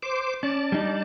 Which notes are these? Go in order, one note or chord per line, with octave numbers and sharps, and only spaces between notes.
C5 D6
C#4 D5 A5
G3 D4 D#4